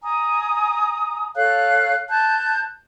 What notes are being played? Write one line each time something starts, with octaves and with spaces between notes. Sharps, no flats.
G#5 A#5 D#6
A4 C#5 F5 F#6
A5 F#6 G6